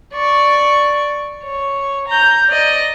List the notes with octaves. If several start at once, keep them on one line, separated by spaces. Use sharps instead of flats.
D5 C#6
C#5
A#5 G6
D5 D#5